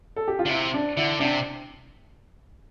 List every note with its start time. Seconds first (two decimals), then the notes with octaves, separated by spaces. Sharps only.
0.16 A4
0.28 G4
0.39 F4
0.46 D3
0.49 C3 E4
0.74 D4
0.97 D3 E4
1.20 C3 D4